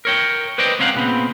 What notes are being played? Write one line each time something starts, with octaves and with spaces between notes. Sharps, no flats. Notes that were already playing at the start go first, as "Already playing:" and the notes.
A#4 C#5 G5
B4 C5 D5 D#5 G5
C#2 C4 C#4 A#4 F5 F#5
A#2 C#3 B3 C4